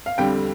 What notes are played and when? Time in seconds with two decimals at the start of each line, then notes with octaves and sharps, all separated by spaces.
0.06 F5
0.18 F2 D3 G3 G5